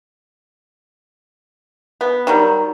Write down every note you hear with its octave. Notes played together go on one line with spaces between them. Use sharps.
B3
D#3 F#3 G3